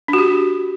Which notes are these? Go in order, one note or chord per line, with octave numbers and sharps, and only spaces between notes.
D4
F#4
G4